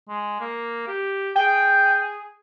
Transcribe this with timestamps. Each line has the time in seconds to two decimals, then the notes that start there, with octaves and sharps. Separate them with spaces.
0.09 G#3
0.41 A#3
0.88 G4
1.36 G#4 G5